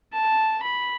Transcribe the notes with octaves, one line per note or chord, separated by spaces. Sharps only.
A5
B5